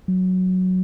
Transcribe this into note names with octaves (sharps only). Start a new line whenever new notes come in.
F#3